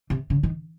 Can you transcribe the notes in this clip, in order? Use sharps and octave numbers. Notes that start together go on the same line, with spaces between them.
C3
C#3
D#3